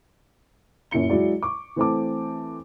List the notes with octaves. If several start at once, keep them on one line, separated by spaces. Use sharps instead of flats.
F#2 A#2 E4 C#7 G7
F#3 G#3 E4 F#4 D5
C#6 D6
E3 A3 C4 C5 A5 D6